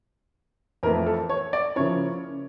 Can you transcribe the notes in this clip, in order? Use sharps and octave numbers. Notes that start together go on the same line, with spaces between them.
F2 E3 A3 E4 A#4
A4
C#5
D5
C#3 F3 A#3 C#4 E4 C#5